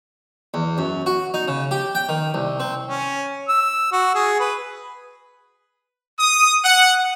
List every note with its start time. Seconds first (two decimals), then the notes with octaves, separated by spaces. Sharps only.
0.54 E2
0.78 F#2
1.06 F#4
1.34 D#4
1.48 C#3
1.71 G4
1.95 G5
2.09 D#3
2.34 C2
2.60 C4
2.86 C#4
3.49 E6
3.93 F#4
4.15 G#4
4.40 B4
6.20 D#6
6.63 F#5